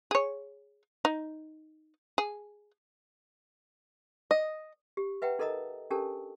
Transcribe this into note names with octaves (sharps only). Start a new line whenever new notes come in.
G#4 C#5
D#4
G#4
D#5
G4
B4 E5 F#5 G5 A#5
D#4 A4 A#4 D#5 A#5 D#6
C#4 D4 G4 A4 A#4 A5